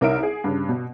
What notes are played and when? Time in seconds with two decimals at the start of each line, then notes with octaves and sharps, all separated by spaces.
0.01 C2 D#4 A#4 C#5 E5 D7
0.23 G#4
0.44 G2 C#3
0.69 B2